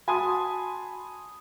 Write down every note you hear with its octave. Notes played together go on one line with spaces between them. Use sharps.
F#4 G#5 A5 B5 C6 D#6